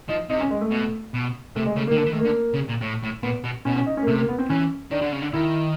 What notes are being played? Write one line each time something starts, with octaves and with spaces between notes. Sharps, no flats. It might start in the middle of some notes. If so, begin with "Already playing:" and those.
F3 D#4
C3 D#4
C#4
G#3
A3
B2
B2
C3 A3
G#3
C#3 A3
A#3
D#3
D3 A#3
E3
D#3 A3
A#3
D3
C#3
A#2
A2
A2
A#2 B3
B2
B2 C#4
C#4
D#4
C#4
A#3
C3 A3
A#3
B3
C4
E3 C#4
D#3 D4
D3
C#3
D3
D#3 E4